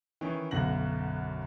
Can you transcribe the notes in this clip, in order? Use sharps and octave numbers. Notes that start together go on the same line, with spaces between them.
D#3 E3 C#4
B1 F#2 D3 A#6 F#7